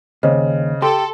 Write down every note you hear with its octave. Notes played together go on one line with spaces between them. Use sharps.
D#2 C#3 C5 D#5
G4 A4 C6